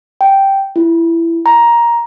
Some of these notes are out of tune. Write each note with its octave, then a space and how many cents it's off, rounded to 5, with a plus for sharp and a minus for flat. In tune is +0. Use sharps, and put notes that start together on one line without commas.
G5 -5
E4 +20
A#5 +10